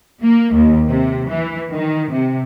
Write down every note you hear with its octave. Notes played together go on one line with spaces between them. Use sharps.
A#3
D#2
C3
E3
D#3
C3